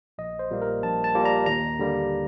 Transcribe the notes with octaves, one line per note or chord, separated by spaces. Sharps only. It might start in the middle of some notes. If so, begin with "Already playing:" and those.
A#1 D#5
C5
A#2 G3 A#3
A#4
A#1 A5
A5
A#2 G3 A#3
A#5
D#2 A#5
D3 G3 A#3